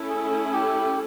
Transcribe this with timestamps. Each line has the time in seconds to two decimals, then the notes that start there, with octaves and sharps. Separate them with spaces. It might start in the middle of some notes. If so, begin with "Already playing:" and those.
Already playing: A3 C#4 E4 A4
0.09 G#4
0.53 G4